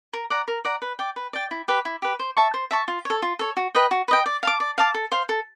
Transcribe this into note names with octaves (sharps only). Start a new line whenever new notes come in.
A#4
D5 F#5 A#5
A#4
D5 F#5 A#5
B4
D5 G5
B4
D5 G5
E4
G4 B4
E4
G4 B4
C5
E5 A5 C#6
C5
E5 A5 C#6
F4
A4 C#5
F4
A4 C#5
F#4
B4 D#5 G5
F#4
B4 D#5 G5
D5
F5 A5 D6
D5
F5 A5 D6
A4
C5 F5
A4